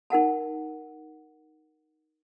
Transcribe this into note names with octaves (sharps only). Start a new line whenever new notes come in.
D#4 A#4 F#5 A5